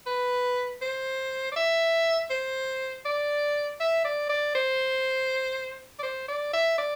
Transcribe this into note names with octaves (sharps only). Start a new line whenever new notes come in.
B4
C5
D5
E5
C5
D5
E5
D5
D5
C5
D5
C5
D5
E5
D5